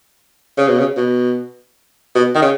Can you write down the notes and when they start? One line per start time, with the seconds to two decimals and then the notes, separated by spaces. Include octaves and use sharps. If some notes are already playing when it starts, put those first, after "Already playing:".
0.58 C#3
0.68 B2
0.79 C#3
0.97 B2
2.15 B2
2.35 D#3
2.42 C#3